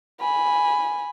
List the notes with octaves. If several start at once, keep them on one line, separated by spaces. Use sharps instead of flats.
G#5 B5